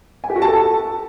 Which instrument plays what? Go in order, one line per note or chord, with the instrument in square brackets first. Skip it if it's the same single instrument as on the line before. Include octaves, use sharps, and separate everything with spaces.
[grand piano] G#5
G4
F#4
A5
A4